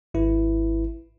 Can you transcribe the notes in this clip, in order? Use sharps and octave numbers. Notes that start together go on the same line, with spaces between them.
G#1 E4 B4